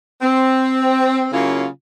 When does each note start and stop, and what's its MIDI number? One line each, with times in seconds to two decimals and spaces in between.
0.22 1.25 60
1.32 1.66 49
1.32 1.66 54
1.32 1.66 58
1.32 1.66 61
1.32 1.66 64
1.32 1.66 65